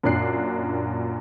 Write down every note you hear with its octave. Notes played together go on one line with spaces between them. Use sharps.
F#2 A#2 D4 F#6 C7